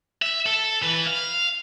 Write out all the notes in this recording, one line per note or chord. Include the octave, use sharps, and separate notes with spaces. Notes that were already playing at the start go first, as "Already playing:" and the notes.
E5
A4
E3 B4
F5